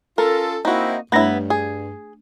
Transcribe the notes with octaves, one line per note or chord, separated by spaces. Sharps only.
C#4 F4 A4 A#4
A#3 C4 D#4 E4 F#4
G2 A3 B3 D4 E4 C#5
G#4